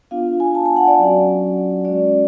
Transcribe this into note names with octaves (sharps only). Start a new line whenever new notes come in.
B3 D4 F4 F5
G#5
A5
G#5
F#5
D5
F#3 C#4 F#4
G#3 C#4 F#4 D5